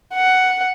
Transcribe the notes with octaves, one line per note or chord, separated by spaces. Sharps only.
F#5